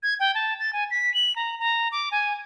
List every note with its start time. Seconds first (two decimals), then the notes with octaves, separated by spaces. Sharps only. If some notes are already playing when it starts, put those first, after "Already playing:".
0.03 G#6
0.20 G5
0.35 A5
0.60 A6
0.73 G#5
0.91 B6
1.14 F#7
1.36 A#5
1.59 A#5
1.92 D6
2.11 G#5